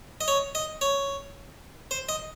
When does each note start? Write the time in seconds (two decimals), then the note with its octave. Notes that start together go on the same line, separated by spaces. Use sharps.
0.21 D#5
0.28 C#5
0.55 D#5
0.81 C#5
1.91 C5
2.09 D#5